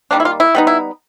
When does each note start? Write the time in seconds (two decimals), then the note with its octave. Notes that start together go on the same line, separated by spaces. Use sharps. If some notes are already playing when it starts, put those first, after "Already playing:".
0.11 D#3 G3 A#3 D4
0.20 E4
0.25 F4
0.40 E4
0.55 G3 B3 D#4
0.67 E4